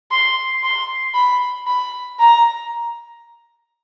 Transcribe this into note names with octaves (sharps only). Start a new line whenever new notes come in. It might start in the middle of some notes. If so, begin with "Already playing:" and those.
C6
C6
B5
B5
A#5